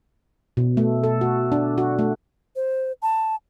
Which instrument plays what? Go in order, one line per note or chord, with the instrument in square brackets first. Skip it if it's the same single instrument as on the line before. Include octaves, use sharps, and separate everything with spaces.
[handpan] B2
A3
A4
F#4
D4
F#4
A3
[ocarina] C5
A5